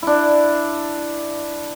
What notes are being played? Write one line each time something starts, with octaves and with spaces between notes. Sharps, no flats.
D4 E4